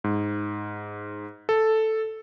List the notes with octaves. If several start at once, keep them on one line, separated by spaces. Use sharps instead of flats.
G#2
A4